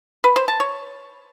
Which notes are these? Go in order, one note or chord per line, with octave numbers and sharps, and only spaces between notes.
B4
C5
A5
C#5